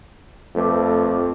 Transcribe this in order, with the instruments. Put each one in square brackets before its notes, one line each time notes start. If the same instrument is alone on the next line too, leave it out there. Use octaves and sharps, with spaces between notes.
[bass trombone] F2 [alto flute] A3 [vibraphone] A4 B4 D6